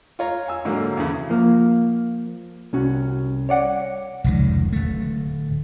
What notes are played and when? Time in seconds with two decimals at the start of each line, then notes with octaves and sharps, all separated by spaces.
0.19 F4 C#5 A#5
0.48 G#5 E6
0.65 G#2 D3 F#3 A#3
0.97 E2 C#3
1.30 F3 A#3
2.73 C2 C#4 F#4
3.49 C#5 D5 F#5
4.24 F1 C#2 D#3
4.72 D1 A3